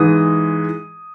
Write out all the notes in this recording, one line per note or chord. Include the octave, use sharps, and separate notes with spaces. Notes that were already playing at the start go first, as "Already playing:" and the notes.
Already playing: G#2 E3 G#3 D#6